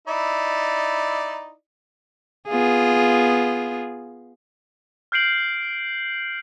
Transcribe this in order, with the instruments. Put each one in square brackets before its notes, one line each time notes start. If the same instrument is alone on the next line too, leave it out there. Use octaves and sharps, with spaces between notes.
[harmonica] D#4 E4 D5
[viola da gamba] B3 F4 G#4
[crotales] F6 G6 C7 D7 F#7